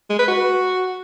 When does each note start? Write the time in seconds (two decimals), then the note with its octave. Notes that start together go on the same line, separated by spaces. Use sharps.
0.10 G#3
0.19 B4
0.28 F#4